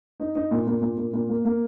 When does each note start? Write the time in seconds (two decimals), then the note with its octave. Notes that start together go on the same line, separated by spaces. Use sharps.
0.20 D#4
0.35 D#4
0.51 A#2
0.67 A#2
0.82 A#2
0.98 A#2
1.13 A#2
1.29 A#3
1.45 A#3